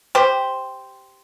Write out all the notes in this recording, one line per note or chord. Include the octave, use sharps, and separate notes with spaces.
G4 C5